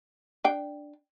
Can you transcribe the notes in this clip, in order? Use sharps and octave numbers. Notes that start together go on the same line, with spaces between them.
D4 G5